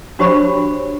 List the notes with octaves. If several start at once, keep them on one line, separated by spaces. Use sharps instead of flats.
D4 F#4 G4 C5 C#5 B5